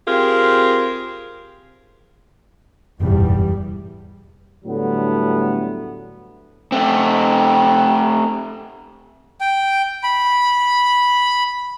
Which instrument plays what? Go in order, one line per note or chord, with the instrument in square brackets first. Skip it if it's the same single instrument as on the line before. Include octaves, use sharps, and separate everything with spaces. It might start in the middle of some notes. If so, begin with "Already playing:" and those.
[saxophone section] C4 F4 G4 G#4 A#4
[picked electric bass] F#1 G#2 B2 [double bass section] E2 G3
[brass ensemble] A2 D3 F#3 G3 A3 B3
[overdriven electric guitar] A3 C4
[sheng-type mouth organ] G5
B5